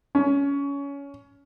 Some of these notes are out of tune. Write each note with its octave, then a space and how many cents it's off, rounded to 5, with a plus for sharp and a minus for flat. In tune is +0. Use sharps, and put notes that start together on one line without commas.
C#4 +20